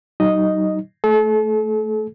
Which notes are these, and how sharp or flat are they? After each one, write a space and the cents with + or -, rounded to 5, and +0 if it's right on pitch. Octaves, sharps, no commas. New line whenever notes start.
F#3 +45 D#4 +0 D#5 +0
A3 +0 A4 -40